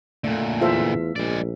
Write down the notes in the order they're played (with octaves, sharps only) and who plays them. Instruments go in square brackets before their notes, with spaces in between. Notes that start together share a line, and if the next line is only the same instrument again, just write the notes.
[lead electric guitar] A#2 D3 [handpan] A3
[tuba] E2 [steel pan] F4 A4 C5 [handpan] E5 F5
[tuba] A#1 [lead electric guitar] G#3 D5